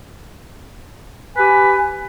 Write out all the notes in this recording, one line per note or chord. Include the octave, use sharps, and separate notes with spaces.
G4 B4 G#5